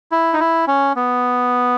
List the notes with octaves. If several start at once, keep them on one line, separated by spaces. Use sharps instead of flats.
E4
D#4
E4
C#4
B3